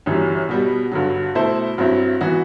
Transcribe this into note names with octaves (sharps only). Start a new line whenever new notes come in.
G1 F#2 E3 G3
B2 G3 B3
G2 D3 F#3
B2 A3 E4 A4 C5
G2 F#3 C4 E4
E3 B3 F#4